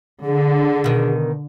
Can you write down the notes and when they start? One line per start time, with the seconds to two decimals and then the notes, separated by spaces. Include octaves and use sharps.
0.24 D3 G#4
0.84 B2 D#3